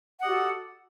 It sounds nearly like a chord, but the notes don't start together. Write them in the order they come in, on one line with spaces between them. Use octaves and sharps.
F#5 D#5 G4 F#4 A4